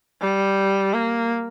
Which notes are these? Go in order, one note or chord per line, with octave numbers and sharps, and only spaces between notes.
G3
A#3